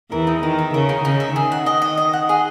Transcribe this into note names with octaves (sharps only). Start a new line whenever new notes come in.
E2 E3 A#4
D#4
D#3 A#4
E5
C#3 A#4
D#4
C#3 D#4
E5
D#3 G#4
F#5
D#5
D#5
D#5
F#5
G#4